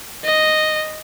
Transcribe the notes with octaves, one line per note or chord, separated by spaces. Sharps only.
D#5